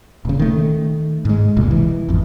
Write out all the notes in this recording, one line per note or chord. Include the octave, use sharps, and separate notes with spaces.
D#1 C#3
D#3 A3
G#2 G#3
E1 C2 A#2
E3
G#1 F2